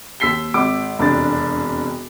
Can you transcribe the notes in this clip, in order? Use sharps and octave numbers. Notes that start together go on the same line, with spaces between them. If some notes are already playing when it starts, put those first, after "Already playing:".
D#2 E6 B6 C7 G7
G#1 D6 D7
E1 F2 C3 D4 A6